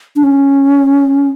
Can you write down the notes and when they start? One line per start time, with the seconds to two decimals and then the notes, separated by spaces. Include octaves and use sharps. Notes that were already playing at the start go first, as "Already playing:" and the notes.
0.16 D4
0.23 C#4